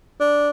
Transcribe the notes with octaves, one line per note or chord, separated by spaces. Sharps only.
D4